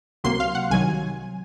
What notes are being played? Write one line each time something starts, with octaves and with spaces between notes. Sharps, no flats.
C#2 C3 F#3 A#3 C6
F5
F#5
C2 C3 D#3 F#3 G#5